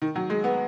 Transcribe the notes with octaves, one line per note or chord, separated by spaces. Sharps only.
D#3
F#3
G#3
B3